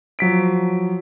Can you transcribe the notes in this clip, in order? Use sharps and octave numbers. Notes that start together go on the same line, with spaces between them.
F3 F#3 B6 D7